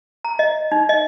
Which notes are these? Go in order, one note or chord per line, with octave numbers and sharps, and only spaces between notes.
A#5
D#5
D#4
D#5